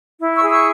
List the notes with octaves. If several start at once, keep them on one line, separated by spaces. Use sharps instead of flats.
E4
C#6 E6
G#4
C#6 E6